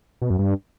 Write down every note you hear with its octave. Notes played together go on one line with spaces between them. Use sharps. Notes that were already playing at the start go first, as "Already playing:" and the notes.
B2
F#2
G2